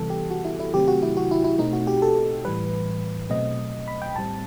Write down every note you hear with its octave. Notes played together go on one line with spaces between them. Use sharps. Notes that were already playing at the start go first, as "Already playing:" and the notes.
Already playing: C3 E3 G3 B3 A4
G4
F#4
E4
E4
C3 D#3 F#3 A3 C4 G4
F#4
E4
F#4
E4
E4
B2 A3 C4 D#4
F#4
G4
A4
A2 E3 G3 B4
B2 F#3 A3 C4 D#5
B5
G5
A2 G3 C4 A5